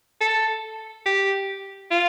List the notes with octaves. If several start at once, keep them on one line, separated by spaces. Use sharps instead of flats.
A4
G4
F4